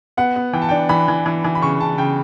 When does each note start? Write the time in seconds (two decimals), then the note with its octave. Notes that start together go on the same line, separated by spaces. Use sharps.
0.17 B3 F#5
0.36 B3
0.53 E3 G5
0.62 A5
0.69 D4 G5
0.89 E3 B5
1.08 E3
1.26 E3
1.44 E3
1.55 B5
1.62 C#3 C#6
1.80 C#3 A5
1.98 C#3 G5